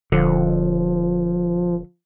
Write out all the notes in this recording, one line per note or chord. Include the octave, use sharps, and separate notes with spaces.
D#1 D3 F3